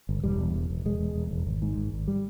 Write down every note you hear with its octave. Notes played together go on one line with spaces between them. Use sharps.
G1
E1 G3
E2
E1
E1
E1 G#3
E1
E1
E1
G#1
G#2
G#1
G#1
G3